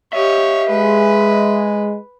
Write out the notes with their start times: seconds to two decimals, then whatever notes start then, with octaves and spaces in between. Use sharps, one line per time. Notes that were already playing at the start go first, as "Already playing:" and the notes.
0.13 G4 C#5 D#5 E5
0.70 G#3 B4